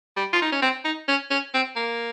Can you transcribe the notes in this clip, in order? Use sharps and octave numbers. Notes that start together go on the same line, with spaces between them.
G3
F4
D#4
C#4
C4
D#4
C#4
C#4
C4
A#3